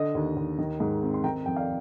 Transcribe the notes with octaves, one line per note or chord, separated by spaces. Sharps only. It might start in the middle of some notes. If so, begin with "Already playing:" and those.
Already playing: D3 D#5
D#2
D#2
D#3
G#2
C4
C6
D#3 G5 A#5
F2 G5
D5 F5